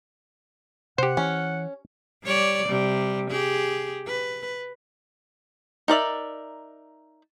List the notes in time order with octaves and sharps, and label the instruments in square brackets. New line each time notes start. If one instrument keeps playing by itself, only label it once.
[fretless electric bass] C3 [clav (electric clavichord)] G4 C5 [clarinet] F#5
[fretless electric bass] E3 [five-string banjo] C#4
[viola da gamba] G3 C#5 D5
C3 G3
G4 G#4
B4
[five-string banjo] D#4 A#4 D5 E5